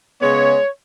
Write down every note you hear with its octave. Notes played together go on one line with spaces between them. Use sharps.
C#3 G#3 B3 C#5